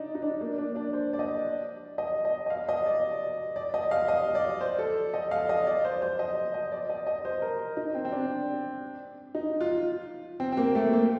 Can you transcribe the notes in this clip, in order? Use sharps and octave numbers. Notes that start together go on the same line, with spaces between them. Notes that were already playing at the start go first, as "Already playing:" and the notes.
Already playing: D4 D#4
D#4
D4
A#3
D4
D4
C5
D5
D#5
D#5
D#5
D#5
F5
D#5
D5
D5
D#5
F5
D#5
D5
C5
A4
D#5
F5
D#5
D5
C5
C5
D#5
D#5
D5
D#5
D#5
C5
A#4
D#4
C4
C4
D4
D#4
F4
C4
C4
A#3
A3
A#3